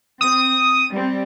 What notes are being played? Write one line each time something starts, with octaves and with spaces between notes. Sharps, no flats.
C4 D#6
G3 C4